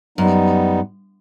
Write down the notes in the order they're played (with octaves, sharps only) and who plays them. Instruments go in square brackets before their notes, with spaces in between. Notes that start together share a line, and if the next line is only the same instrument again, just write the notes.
[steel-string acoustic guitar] F#2 [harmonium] G3 B3 D#4